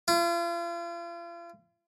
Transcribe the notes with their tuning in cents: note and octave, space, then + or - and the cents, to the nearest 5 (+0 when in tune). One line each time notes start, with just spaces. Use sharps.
F4 -40